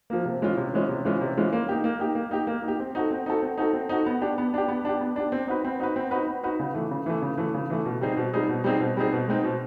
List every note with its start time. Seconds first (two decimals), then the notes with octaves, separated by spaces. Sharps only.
0.10 F3 A#3
0.25 C3
0.42 E3 G#3 C#4 F4
0.57 C3
0.73 E3 G#3 C#4 F4
0.89 C3
1.05 E3 G#3 C#4 F4
1.21 C3
1.37 E3 G#3 C#4 F4
1.53 A#3
1.69 D#4 G4
1.84 A#3
2.00 D#4 G4
2.15 A#3
2.31 D#4 G4
2.47 A#3
2.63 D#4
2.68 G4
2.80 C4
2.95 D#4 F#4 A4
3.11 C4
3.26 D#4 F#4 A4
3.42 C4
3.58 D#4 F#4 A4
3.73 C4
3.89 D#4 F#4 A4
4.06 B3
4.21 D4 G4
4.38 B3
4.54 D4 G4
4.68 B3
4.85 D4 G4
5.01 B3
5.16 D4 G4
5.32 C4
5.47 D#4 F#4 B4
5.65 C4
5.80 D#4 F#4 B4
5.96 C4
6.11 D#4 F#4 B4
6.27 C4
6.43 D#4 F#4 B4
6.59 C#3
6.74 E3 A3
6.91 C#3
7.06 E3 A3
7.22 C#3
7.37 E3 A3
7.54 C#3
7.70 E3 A3
7.85 B2
8.01 G3 C4 D#4 G#4
8.17 B2
8.33 G3 C4 D#4 G#4
8.49 B2
8.64 G3 C4 D#4 G#4
8.80 B2
8.97 G3 C4 D#4 G#4
9.12 B2
9.28 G#3 C4 D#4
9.44 B2